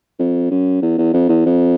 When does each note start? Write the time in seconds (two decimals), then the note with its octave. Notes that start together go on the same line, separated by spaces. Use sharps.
0.19 F2
0.51 F#2
0.82 E2
0.98 E2
1.13 F2
1.29 E2
1.46 F2